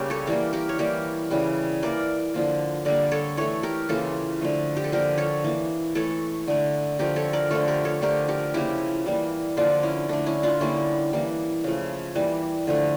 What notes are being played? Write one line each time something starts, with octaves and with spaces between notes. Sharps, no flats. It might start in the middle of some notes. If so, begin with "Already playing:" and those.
Already playing: C#3 G3 A#3 C#4 G4
A4 C#5
E3 G3 A#3 G4 A#4
G4 A#4
C#5
E3 G3 A#3 G4 A#4
C#3 E3 G3
E3 A#3 A#4 D5
D3 F3 A#3
D3 G3 A#3 A#4 D5
A4 C#5
E3 A3 A4 C#5
G4 A#4
C#3 E3 A#3 F4 A4
D3 F3 A3
G4
A4
D3 F3 A#3 G4 A#4
A4 C#5
E3 A#3
E3 A3 A4 C#5
D3 A3
D3 F3 A3 G4 A#4
A4 C#5
A#4 D5
D3 F3 A3 A4 C#5
G4 A#4
A4 C#5
D3 F3 A3 G4 A#4
G4 A#4
C#3 F3 A#3 E4 G4
E3 G3 A#3
D3 F3 A#3 D4 F4
C#4 E4
D3 A3 D4
C#4 E4
D4 F4
D3 G3 A#3 C#4 E4
E3 G3 A#3
C#3 F3 A3
E3 G3 A#3
D3 F3 A3